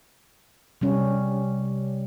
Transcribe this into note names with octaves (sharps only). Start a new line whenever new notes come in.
C3 G3 C#4